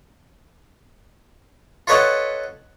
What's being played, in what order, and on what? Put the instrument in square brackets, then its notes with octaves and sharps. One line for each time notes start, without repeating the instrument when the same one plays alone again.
[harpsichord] F4 A4 B4 C#5 D#5 F#5